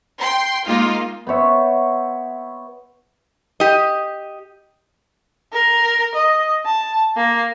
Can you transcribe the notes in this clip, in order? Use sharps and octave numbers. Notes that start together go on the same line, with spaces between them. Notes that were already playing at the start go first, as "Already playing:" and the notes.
G5 C6
G#3 A#3 D#4 F4
B3 C5 C#5 E5
G4 D#5
A#4
D#5
A5
A#3